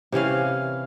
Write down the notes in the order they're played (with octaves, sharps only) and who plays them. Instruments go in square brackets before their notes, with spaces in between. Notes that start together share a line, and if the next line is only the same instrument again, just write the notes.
[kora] C3 E3 C#4 F5